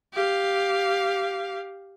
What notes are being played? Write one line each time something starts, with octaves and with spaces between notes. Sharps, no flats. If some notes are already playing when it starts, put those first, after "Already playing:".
G4 F5